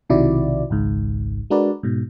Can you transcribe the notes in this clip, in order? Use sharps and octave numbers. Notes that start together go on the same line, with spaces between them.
B1 C3 D#3 E4 F#4 D5
G#1 C#2 G#2
G#3 D4 F#4 A#4 B4 D5
G#2 B2